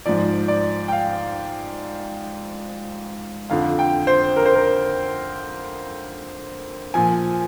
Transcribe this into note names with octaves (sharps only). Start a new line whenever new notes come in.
G#2 F3 D5
D5
G5
F5
F2 D3 F3 F5
G5
C5
A#4
C5
A#4
A#2 F3 G#5